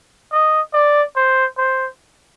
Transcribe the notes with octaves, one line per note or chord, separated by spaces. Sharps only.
D#5
D5
C5
C5